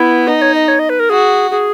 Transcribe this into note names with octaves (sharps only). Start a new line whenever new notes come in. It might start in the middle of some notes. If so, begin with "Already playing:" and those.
Already playing: B3 E4
D#4 D#5
C#5
D#5
C#5
D#5
B4
A#4
F#4 G#4
G#4